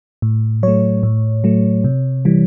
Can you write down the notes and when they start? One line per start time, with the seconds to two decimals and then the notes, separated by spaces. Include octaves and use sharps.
0.22 A2
0.63 F#3 A3 C#5
1.03 A2
1.44 F#3 A3
1.84 C3
2.25 E3 G3